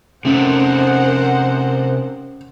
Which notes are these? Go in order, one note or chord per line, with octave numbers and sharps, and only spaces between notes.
C3 A3 C#4 A#4 C5 F#5